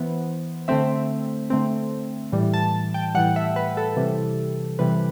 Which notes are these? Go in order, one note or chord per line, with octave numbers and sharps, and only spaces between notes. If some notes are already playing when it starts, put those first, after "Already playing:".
Already playing: E3 B3 C5
D3 A3 C4 E5
D3 A3 C4
A2 E3 G3
A5
G5
A2 E3 G3 F#5
E5
B4
A4
C3 E3 G3
C3 E3 G3 B4